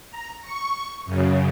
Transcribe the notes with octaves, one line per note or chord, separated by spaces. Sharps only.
A#5
C#6
F#2 C#3